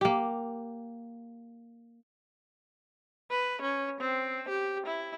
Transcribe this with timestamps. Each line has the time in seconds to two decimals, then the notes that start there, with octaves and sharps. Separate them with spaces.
0.01 A#3 G4
3.30 B4
3.61 C#4
4.00 C4
4.48 G4
4.86 E4